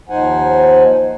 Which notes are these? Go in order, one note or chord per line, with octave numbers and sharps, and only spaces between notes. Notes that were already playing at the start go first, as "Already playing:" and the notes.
D#2 F3 D#4 C5 F#5 G#5